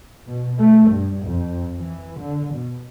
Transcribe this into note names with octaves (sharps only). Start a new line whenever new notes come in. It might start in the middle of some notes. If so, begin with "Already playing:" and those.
B2
A3
G2
F2
E3
D3
B2